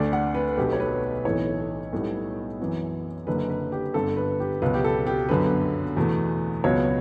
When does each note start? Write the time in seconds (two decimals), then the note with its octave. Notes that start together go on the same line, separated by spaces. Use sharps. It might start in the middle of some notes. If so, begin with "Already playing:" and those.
Already playing: D2 D3 A3 D5
0.13 F#5
0.35 B4
0.58 B1 B2 A3 G4
0.73 C#5
0.80 B4
1.25 B1 A2 E3 C#5
1.93 B1 A2 G3 B3
2.60 F#2 E3 B3
3.27 F#1 F#2 D3 B4
3.50 B4
3.72 G4
3.94 G1 G2 D3 A4
4.17 B4
4.40 G4
4.62 C#2 B2 F#3 B4
4.74 G4
4.84 A4
5.07 G4
5.29 G1 F#2 D3 F#3 B3 B4
5.97 E2 B2 A3
6.64 C#2 B2 F#3 B3 C#5